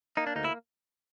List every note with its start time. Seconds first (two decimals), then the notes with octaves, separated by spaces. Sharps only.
0.17 A#3 D#4
0.27 D4
0.36 D2 D#4
0.44 E4